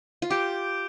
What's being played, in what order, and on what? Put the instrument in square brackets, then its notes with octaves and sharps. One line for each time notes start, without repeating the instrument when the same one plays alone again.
[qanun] F4
[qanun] G4 [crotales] D6 G6 D7 G7